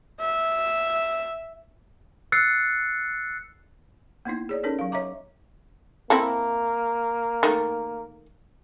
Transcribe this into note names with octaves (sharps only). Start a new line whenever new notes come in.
E5
E6 F#6 A6 C7 C#7
A#3 B3 D#4 E4
G#4 C#5 D5
C#4 D#4 A4 A#4 C#5
F#3 F5
C#5 D#5 E5 A#5 D6
A#3 C4 E4 A4
D#3 A3